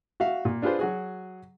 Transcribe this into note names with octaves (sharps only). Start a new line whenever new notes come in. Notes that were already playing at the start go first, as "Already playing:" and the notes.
F#4 E5 F5
A#2
D4 F4 G#4 B4 C5
F#3 F#4 G#4